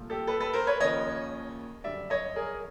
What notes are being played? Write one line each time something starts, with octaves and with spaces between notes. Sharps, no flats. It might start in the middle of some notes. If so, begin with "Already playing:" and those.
Already playing: C2 A#2 F3 A3
G4 A4
A4 B4
A4 B4
A#4 C5
B4 C#5
D#2 C#3 F3 C#5 D#5
F#2 D3 G3 D5 E5
C#5 D#5
G#4 A#4